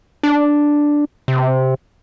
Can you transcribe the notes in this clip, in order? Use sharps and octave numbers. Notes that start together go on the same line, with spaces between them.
D4
C3